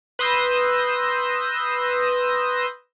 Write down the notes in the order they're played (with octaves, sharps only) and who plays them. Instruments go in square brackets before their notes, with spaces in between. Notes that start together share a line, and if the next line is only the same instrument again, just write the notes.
[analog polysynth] B4 C6 D#6 E6 G6 A#6